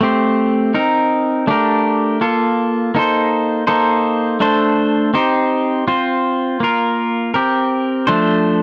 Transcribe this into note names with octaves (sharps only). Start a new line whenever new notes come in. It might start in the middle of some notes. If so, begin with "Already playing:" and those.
A3 C4 G4 C5
C4 D#4 A#4
A3 D4 G4 A#4
A#3 F4 A4
A#3 D#4 A4 C5
A#3 D#4 A4 C5
A3 D4 A4 C5
C4 D#4 G4 C5
C4 F4 C5
A#3 F4 A#4
C4 G4 A#4
F3 A3 D4 A4 C5